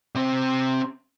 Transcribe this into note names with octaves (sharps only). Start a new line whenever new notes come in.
C3 C4